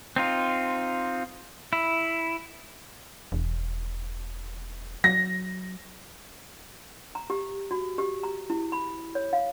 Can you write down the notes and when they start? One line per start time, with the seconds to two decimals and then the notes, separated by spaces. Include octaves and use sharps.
0.16 C4 D#4 F4
1.73 E4
3.32 E1
5.04 F#3 A#6
7.15 A#5
7.30 G4
7.71 F#4
7.98 G4
8.23 A#5
8.50 E4
8.72 B5
9.15 C#5
9.33 F5